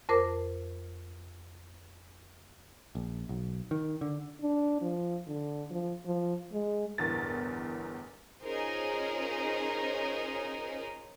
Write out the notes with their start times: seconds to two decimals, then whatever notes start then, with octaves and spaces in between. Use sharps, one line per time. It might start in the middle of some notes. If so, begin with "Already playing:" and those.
0.09 F2 A#4 C5 D6
2.95 A#1
3.29 B1
3.71 D#3
4.01 D3
4.41 D4
4.82 F3
5.27 D3
5.70 F3
6.05 F3
6.53 G#3
6.98 G1 E2 A2 A#4 A6
8.42 C#4 D#4 F4 G#4 A#4 C5